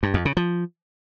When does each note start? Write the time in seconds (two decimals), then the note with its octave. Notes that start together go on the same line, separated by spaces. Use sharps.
0.03 G2
0.14 F2
0.25 C#3
0.37 F3